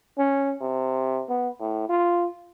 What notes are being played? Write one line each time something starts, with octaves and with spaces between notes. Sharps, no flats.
C#4
C3
B3
A2
F4